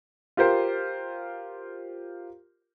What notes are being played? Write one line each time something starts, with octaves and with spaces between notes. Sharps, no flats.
F4 G4 A#4 C5